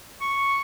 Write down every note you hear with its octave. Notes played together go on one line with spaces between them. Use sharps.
C#6